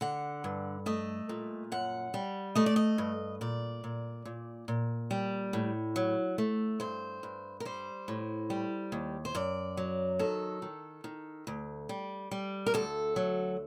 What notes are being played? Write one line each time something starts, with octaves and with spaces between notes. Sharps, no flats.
D3 F#5
G2
A3 D#5
A#2
F#2 F#5
G3
A3 D#5
D5
D#5
G2
A#2 D5
A#2
A#2
A#2
G3
A2
F#3
A3
G2 C5
G2
A#4
G3 C5
A2
G3
D#2
C5
F#2 D5
F#3
D#3 A4
D#3
D#3
D2
G3
G3
A#4
D2 A4
F#3